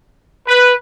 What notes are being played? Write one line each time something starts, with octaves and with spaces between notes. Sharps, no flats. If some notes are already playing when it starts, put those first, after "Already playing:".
B4